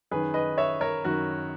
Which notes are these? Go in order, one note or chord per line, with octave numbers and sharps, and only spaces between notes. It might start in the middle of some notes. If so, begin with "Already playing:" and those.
F#2 D#3 G#4 B4
B4 D#5
C#5 E5
A#4 C#5
F#2 D#3 F#4 A#4